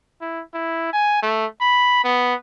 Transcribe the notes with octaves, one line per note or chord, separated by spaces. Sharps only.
E4
E4
G#5
A3
B5
B3